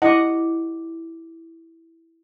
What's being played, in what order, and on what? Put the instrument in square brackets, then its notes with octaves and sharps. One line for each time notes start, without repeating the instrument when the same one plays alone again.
[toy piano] E4 G4 D6 [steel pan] D#5 F#5